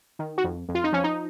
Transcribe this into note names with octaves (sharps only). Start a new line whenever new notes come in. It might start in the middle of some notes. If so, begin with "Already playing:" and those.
D#3
F#4
F2
F2
F4
D#4
F3 C#4
D#4